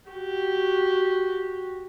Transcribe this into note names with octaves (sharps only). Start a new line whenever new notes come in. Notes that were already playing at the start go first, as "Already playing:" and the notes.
F#4 G4